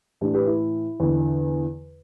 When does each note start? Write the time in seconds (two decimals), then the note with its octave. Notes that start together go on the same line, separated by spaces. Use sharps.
0.21 A2 E3 D4 G4
0.34 G4 B4
0.47 E4
1.00 E2 D3